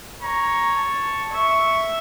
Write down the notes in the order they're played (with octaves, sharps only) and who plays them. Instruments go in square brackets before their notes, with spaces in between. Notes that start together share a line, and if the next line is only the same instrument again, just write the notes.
[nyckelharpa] C#5 [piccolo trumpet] A#5
[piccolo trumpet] A5
[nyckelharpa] E5 [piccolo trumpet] C#6